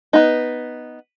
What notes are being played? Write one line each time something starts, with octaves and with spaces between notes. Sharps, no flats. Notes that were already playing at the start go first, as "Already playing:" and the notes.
B3 D#4